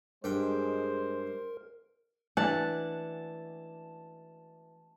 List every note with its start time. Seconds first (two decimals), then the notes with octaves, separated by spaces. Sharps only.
0.24 G2 G#3 A#4 C5 G5
2.37 E3 D4 F#5 A5